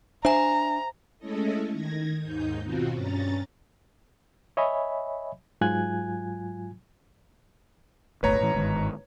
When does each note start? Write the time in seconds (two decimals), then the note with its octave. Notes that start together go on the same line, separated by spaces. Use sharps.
0.25 D4 C5 E5 G#5 A#5
1.19 G#3 A3 C#4 E4 A4 D#5
1.72 D#3 G#6 A#6
2.19 D#2 G#2 D#4 G6
2.63 B2 D#3 C4 F4 F#4
2.94 G2 C#4 A#5 A6
4.57 C#5 D#5 E5 G#5 B5
5.61 G#2 F#3 F4 G#5 F#6 G#6
8.23 D1 G1 A3 B4 C#5 A#5
8.41 A2 E3
8.54 G1 G#2 D#3